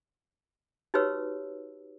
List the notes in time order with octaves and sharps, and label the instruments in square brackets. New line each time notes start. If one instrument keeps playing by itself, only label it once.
[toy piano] D#4 F#4 G4 B4 C#5 E6